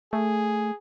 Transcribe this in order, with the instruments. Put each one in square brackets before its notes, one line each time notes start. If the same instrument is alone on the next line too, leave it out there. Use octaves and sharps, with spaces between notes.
[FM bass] A3 [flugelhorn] G#4